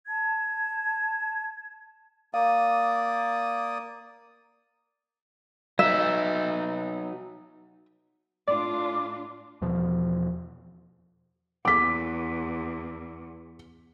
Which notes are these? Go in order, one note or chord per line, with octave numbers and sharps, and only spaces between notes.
A5 G#6
A#3 D5 F5 D#6
F#3 D#4 E5
A2 D4 F4 D5 D6
E2 B2 F3
E2 D6 B6